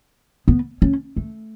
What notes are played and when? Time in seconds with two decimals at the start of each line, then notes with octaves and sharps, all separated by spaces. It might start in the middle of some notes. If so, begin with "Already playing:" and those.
0.48 B3
0.82 C#4
1.16 A3